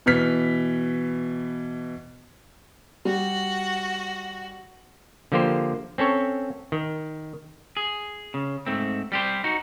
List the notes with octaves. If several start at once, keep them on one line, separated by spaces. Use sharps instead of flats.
B2 E3 F6 B6
G3 F#4
D3 F3 A#3 G4 C5
C4 C#4 A4 C#5
D#3
G#4
C#3
G#2 A3 C4
G3 G4 C5
D#4 F#4